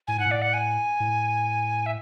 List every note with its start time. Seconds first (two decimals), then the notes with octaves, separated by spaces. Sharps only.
0.07 A2 G#5
0.17 G#2 F#5
0.26 A2
0.31 D5
0.42 F#5
0.54 G#5
1.00 A2
1.86 E5